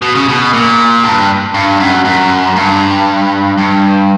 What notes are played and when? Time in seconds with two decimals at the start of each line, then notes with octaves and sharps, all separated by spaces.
0.02 B2
0.15 C#3
0.28 B2
0.53 A#2
1.03 G2
1.54 G2
1.80 F#2
2.05 F#2
2.56 G2
3.58 G2